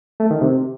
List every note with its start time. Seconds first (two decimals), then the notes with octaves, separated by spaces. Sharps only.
0.20 A3
0.30 D#3
0.41 C3